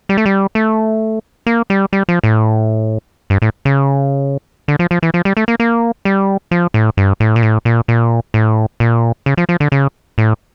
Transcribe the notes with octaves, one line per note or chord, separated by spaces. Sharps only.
G3
A3
G3
A3
A#3
G3
G3
F3
A2
G2
A2
C#3
D3
F3
F3
E3
F3
G3
A3
A#3
A#3
G3
F3
A2
G2
A2
A#2
A2
A#2
A#2
A2
A#2
C#3
F3
F3
D3
C#3
A2